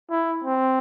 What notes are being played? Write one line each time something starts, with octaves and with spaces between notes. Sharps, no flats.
E4
C4